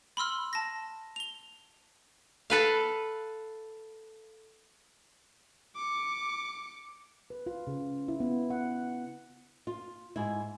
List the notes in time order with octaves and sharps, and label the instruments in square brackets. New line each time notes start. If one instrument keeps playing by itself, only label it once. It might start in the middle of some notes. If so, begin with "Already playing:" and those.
[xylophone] B5 C6 E6 F6
A5 A#6
F7 G7
[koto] A4 B4 F5
[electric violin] D6 C#7
[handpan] B4
F4
C#3
E4
B3
F#5
[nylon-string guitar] F4
G#2 E4